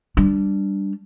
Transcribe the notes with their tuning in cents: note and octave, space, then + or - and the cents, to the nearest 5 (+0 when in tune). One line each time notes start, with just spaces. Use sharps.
G3 +0 D4 +0